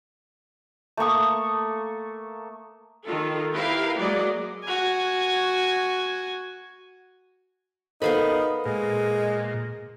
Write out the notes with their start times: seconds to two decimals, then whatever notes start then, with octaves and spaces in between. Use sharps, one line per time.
0.97 A3 A#3 C#6 D#6
3.05 D#3 F4 A4
3.53 E4 G4 A#4 B4 F5 G5
3.98 F#3 G#3 A#3 G#4 D5 D#5
4.65 F#4 G#5
8.02 B3 D#4 A4 A#4 C5 F5 B5
8.66 A#2 G#3